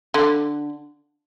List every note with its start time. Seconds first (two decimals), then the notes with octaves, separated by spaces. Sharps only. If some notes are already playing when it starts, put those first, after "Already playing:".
0.14 D3